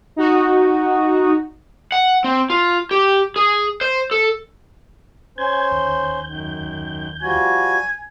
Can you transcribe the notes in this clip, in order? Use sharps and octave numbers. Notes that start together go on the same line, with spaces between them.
D#4 F#4
F#5
C4
F4
G4
G#4
C5
A4
C#4 C5 G#5 G6 G#6
D#2 G6
F#2 D#3
F3 G3 F#4 G#5